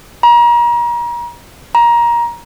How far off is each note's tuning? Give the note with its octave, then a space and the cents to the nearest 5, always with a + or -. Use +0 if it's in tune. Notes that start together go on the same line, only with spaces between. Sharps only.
A#5 +35
A#5 +20